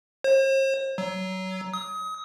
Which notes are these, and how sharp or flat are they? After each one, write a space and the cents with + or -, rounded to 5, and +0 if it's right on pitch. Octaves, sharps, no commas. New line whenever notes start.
C5 +45
F#3 +25
D#6 +30